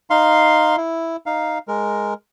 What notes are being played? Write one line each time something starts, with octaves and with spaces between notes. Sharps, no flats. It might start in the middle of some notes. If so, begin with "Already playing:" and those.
D#4 F5 C6
E4
D#4 F5
G#3 A#4